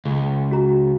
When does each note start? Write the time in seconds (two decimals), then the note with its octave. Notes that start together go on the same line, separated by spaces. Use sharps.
0.05 C#2 G#4
0.51 F#4 G#4 A#5